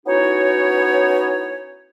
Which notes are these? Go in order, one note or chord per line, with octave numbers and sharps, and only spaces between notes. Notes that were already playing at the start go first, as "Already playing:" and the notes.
B3 C#4 D#4 E4 F#4 C#5